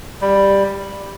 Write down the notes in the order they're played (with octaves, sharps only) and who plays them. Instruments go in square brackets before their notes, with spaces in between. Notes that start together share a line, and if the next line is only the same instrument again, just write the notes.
[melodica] G3